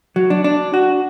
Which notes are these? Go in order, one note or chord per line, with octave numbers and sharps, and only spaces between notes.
F#3
D4
D4
F#4